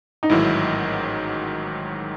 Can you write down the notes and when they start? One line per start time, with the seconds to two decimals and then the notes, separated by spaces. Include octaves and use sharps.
0.23 D#4
0.29 A1 G#2 D#3 F#3 E4